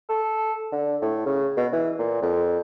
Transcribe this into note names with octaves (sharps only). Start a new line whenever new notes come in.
A4
D3
A2
C#3
B2
E3
A#2
F2